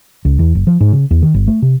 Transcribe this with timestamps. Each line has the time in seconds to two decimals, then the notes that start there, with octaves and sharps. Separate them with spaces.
0.25 C#2
0.39 E2
0.55 F#1
0.67 F3
0.81 G#2
0.93 C#3
1.11 E2
1.23 D#3
1.34 G1
1.48 A3
1.62 C3